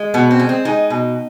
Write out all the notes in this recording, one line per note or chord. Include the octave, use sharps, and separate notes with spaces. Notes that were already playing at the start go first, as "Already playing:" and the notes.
Already playing: G#3
B2 B3
C4
G#3
C4
G#3 D#4
B2